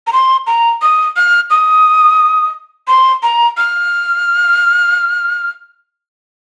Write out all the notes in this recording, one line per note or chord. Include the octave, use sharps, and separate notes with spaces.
A#5
C6
A#5
D#6
F6
D#6
C6
A#5
F6